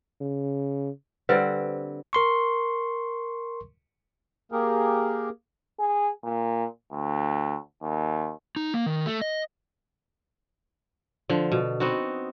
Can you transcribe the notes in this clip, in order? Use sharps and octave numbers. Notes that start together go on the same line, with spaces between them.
C#3
D3 G3 C4 B4 C5
A#4 C6 C#6
A#3 G4 G#4 A#4
G#4
A#2
D2
D#2
D#4
A#3
D#3
A3
D#5
D3 F3
B2
B3 C4 D#4 F#4